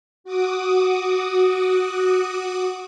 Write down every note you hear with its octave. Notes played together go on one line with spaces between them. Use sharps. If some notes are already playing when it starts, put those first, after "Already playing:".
F#4 D6 D#6